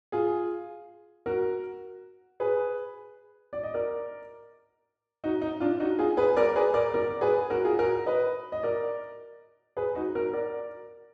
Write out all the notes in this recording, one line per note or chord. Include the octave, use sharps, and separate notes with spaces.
F4 G#4
F#4 A#4
G#4 B4
D5
D#5
A#4 D5
D#4 F#4
D#4
D4 F4
D#4 F#4
F4 G#4
G#4 B4
A#4 D5
G#4 B4
A#4 D5
A#4 D5
G#4 B4
F#4 A#4
F4 G#4
F#4 A#4
B4 D#5
D#5
A#4 D5
G#4 B4
D#4 F#4
F#4 A#4
A#4 D5